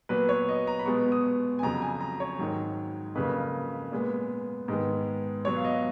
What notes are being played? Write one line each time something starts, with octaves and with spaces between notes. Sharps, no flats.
A#2 F#3 B3 B4
C#5
D#5
A#5
B5
B2 G#3 B3 C#6
D#6
G#5
F2 C#3 F#3 A#5
G#5
A#5
C#5
G#2 D#3 F#3
F2 C#3 F#3 A#3 B4
A#2 G#3 B3
G#2 D#3 G#3 B3
B2 F#3 B3 C#5
F5
D#5